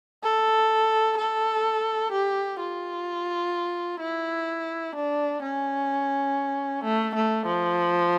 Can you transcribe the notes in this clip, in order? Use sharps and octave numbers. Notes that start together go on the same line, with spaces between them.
A4
A4
G4
F4
E4
D4
C#4
A3
A3
F3